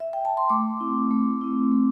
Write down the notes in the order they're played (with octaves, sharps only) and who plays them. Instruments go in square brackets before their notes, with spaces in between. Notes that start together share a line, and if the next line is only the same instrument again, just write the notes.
[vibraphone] E5
G5
A5
C6
A3 D6
C4 E4
A3
C4 E4
A3